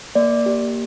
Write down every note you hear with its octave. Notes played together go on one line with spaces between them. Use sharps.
A#3 D5
G4